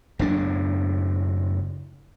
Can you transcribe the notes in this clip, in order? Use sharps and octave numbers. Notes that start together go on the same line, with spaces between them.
F#1 A2 D4